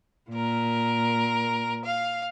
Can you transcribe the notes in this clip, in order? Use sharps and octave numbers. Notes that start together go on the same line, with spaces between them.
A#2 A#4
F5